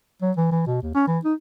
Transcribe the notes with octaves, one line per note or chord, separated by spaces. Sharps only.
F#3
E3
E3
B2
D#2
C#4
E3
D#4